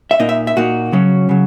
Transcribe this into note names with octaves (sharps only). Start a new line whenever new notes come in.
E5
A#2 A#3 D#4 D#5
E5
E5
A#2 A#3 D#4 F#4
C#3 F#3 C#4
C#3 F#3